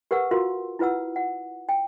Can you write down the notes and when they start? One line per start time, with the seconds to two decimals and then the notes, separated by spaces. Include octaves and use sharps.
0.11 G4 A#4 B4 F#5 E6
0.31 F4 F#4 A#4 F5 C6
0.79 E4 F4 B4 F#5 E6
1.16 F#5
1.69 G5